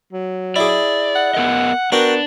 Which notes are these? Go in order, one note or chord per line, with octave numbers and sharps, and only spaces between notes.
F#3
E4 G#4 D5
F#5
B3 A#4 D#5
B3 D4 F#4 A#4 G5